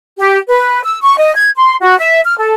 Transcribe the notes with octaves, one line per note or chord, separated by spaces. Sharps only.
G4
B4
E6
C#6
D#5
G#6
C6
F#4
E5
F6
A4